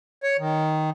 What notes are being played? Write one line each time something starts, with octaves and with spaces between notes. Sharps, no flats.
C#5
D#3